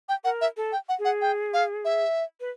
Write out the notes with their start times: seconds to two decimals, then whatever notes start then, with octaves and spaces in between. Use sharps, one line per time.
0.09 G5
0.24 A#4 F#5
0.41 E5
0.57 A4
0.72 G5
0.89 F#5
0.99 G#4
1.05 F#5
1.21 G5
1.54 F5
1.85 E5
2.40 B4